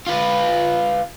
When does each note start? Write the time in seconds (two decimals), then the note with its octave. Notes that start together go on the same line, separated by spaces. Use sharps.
0.07 F4 B4